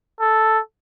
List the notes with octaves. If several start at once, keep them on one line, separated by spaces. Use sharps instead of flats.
A4